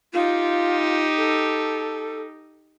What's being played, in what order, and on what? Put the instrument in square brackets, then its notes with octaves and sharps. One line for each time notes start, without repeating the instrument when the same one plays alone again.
[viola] D#4 G4 [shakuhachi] F4
[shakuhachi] A4